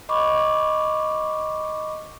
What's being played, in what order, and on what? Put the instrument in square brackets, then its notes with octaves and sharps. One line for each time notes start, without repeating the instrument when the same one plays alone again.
[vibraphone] D#5 B5 C#6 D6